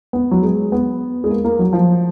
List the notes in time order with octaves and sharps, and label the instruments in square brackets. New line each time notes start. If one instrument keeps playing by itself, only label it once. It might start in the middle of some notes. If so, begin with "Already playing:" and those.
[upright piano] B3
F#3
G#3
B3
G#3
A#3
A#3
F#3
F3